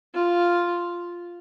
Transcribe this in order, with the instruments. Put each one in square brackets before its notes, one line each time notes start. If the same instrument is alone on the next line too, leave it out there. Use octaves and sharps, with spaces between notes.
[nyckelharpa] F4